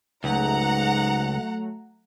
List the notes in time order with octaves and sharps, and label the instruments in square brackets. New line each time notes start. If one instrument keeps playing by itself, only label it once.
[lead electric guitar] C#2 [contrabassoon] G#2 [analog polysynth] F#3 A3 [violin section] F#5 A#5